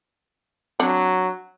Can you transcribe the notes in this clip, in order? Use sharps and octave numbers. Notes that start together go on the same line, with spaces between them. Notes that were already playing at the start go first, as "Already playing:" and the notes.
F#3 C4 D4 F#5